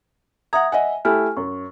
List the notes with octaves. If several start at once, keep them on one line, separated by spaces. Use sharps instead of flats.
E5 F#5 A#5 D#6 G#6
D#5 E5 F#5 G#5
A3 E4 G4 G#5 F6
F#2 C#5 C#6